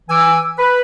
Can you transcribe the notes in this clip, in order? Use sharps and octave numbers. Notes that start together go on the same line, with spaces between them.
E3 G#5 D6 E6
B4